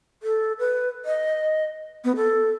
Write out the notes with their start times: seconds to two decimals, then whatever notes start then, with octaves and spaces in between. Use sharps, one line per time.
0.23 A4
0.59 B4
1.05 D#5
2.04 B3
2.16 A4